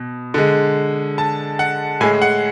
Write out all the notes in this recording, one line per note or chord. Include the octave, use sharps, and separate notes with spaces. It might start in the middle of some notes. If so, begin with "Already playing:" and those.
Already playing: B2
D3 G#3
A5
F#5
A2 G#3 G#5
F#5